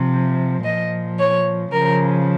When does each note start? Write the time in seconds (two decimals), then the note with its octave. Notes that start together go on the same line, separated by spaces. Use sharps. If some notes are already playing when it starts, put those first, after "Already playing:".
Already playing: C3 F3
0.64 A#2 F3 D#5
1.19 C#5
1.73 C#3 F3 A#4